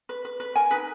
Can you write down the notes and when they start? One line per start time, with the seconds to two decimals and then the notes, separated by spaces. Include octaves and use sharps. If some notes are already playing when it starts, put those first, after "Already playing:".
0.09 B4
0.25 B4
0.40 B4
0.56 A#4 G#5
0.71 D#4 B4